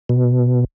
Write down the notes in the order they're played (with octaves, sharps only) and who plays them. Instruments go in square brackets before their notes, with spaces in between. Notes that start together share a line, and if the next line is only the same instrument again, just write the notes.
[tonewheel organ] B2